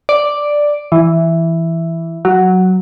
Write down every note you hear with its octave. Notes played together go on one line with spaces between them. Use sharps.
D5
E3
F#3